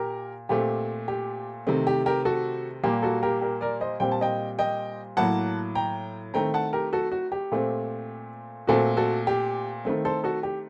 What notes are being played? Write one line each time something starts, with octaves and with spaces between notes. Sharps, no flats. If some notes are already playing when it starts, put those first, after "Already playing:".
Already playing: A#2 G4 A#4
A#2 A3 C4 G4
G4
C3 D#3 A3 C4
G4
G4 A#4
F#4 A4
A#2 G3 A#3 G4
F#4 A4
G4 A#4
G4 A#4
A#4 D5
C5 D#5
A#2 G3 C4 G5
A5
D#5 G5
D#5 G5
A2 F#3 A#3 F#5 A5
G5 A#5
D#3 A3 C4 G5 A#5
F#5 A5
G4 A#4
F#4 A4
F#4
G4
A#2 A3 C4
A#2 A3 C4 F#4 A4
F#4 A4
G4
D#3 A3 C4
A4 C5
F#4 A4
G4